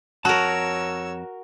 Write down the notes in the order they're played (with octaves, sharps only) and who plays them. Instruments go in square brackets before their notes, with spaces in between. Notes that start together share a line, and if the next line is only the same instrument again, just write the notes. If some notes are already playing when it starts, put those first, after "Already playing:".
[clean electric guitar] F2 A5 [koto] F#4 A#4 [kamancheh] C#5 E6